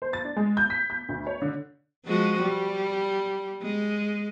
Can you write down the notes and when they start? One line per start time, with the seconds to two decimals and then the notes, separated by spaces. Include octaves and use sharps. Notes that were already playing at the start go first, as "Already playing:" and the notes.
0.02 C5
0.13 A6
0.25 D4
0.36 G#3
0.57 G6
0.70 B6
0.90 G6
1.09 D2
1.27 C#5
1.42 D3
2.06 F3 G#3 F#4
2.42 G3
3.63 G#3